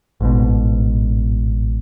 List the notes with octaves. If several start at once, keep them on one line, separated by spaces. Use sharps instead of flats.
A1 G#2 B2